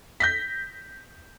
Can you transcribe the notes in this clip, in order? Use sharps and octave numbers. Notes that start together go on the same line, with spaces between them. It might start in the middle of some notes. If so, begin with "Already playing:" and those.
G6 A#6 B6